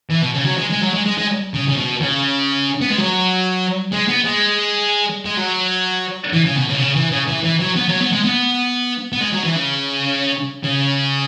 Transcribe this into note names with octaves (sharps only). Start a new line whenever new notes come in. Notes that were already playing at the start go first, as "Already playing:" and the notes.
E3
B2
C#3
F#3
G#3
G#3
F#3
G#3
G#3
G#3
C#3
C#3
B2
C#3
B3
G#3
F#3
G#3
B3
G#3
G#3
F#3
E3
C#3
B2
C#3
B2
C#3
E3
C#3
E3
E3
F#3
B3
F#3
B3
G#3
B3
B3
G#3
F#3
E3
C#3
C#3